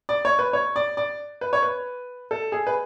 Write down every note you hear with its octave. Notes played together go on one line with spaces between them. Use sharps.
D5
C#5
B4
C#5
D5
D5
B4
C#5
B4
A4
G#4
B4